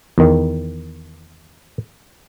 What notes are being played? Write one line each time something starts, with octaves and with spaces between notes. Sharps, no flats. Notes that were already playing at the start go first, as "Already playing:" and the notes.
E2 D#3